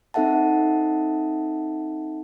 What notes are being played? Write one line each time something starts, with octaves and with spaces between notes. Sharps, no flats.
C4 D#4 A4 E5 F#5 A5